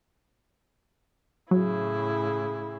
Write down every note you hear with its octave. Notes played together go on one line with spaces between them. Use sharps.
A2 C#3 F#3 E4